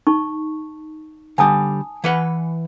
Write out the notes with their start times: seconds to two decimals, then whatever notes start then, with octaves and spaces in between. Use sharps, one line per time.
0.07 D#4 A5 C#6
1.38 D3 G3 G#5 A5 D#6
2.04 E3 B4 F#5